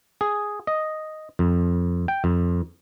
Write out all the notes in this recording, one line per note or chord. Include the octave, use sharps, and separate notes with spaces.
G#4
D#5
F2
G5
F2